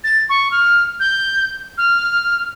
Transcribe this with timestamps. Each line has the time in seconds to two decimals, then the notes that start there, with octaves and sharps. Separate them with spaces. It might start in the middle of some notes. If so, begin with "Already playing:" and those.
0.04 A6
0.29 C#6
0.52 F6
1.00 G6
1.78 F6